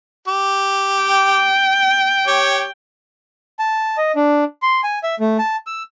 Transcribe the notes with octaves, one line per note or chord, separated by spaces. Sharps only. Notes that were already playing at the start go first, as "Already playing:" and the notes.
G4
G5
G4 C#5
A5
D#5
D4
C6
G#5
E5
A3
A5
E6